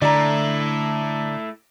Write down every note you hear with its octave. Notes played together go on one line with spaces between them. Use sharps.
D3 A3 E4 D5 A#5